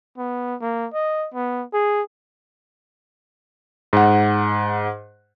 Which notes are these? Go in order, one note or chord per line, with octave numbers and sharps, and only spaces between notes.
B3
A#3
D#5
B3
G#4
G#2 F#5